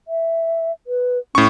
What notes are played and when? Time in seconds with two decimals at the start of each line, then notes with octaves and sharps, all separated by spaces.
0.08 E5
0.87 B4
1.35 A2 C#4 C#6